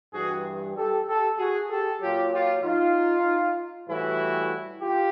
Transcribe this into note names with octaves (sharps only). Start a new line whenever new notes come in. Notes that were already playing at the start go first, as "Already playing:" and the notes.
G2 E3 G3 F#4 G#4
G4 A4
G4 A4
F#4 G#4
G4 A4
A#2 F#3 F4 G4
F4 G4
D#4 F4
A2 E3 G3 E4 F#4
F4 G4